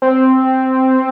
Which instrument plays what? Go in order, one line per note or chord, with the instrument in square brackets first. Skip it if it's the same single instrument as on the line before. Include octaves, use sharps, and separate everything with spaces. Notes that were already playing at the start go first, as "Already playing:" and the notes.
[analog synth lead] C4